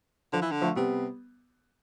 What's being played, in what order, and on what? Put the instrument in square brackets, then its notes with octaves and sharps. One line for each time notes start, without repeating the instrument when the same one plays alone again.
[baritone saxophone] D3 [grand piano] F3
[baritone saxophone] E3
D3
[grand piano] F3 A3
[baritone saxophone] C3 [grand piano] G3 B3